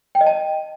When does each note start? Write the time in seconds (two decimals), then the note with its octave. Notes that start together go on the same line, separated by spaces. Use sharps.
0.15 G5
0.21 D#5
0.26 A5